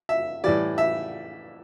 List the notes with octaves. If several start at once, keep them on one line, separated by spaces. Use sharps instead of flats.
E5
A2 E3 G3 D5
E5